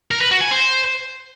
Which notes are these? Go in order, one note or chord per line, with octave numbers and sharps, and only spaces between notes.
A#4
B4
F#4
G#5
C5